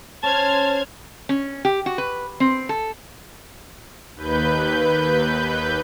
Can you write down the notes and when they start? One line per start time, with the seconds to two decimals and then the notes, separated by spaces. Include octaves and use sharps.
0.23 C#4 C5 A5 F6 G#6
1.29 C#4
1.65 G4
1.86 F#4
1.98 B4
2.40 C4
2.69 A4
4.16 D#2 B4 G6